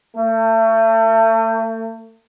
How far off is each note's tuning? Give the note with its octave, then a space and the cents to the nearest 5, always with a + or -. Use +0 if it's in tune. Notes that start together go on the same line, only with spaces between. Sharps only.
A3 +35